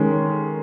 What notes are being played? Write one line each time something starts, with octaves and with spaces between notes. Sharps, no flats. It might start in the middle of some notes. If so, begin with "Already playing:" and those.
Already playing: D#3 G#3 C#4